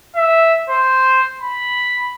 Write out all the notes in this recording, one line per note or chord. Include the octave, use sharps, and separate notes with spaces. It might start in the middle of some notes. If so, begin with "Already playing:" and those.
E5
C5
B5